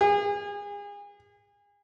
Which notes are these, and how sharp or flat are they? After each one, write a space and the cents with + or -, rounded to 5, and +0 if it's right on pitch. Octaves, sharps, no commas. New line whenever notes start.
G#4 -35